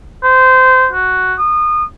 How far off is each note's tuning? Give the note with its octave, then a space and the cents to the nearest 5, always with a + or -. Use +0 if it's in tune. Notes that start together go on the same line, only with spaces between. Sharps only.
C5 -20
F#4 +0
D#6 -30